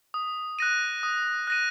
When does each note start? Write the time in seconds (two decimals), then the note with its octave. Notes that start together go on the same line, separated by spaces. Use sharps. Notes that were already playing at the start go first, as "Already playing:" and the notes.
0.14 D#6
0.59 F#6 A#6 D#7
1.03 D#6
1.47 F#6 A#6 D#7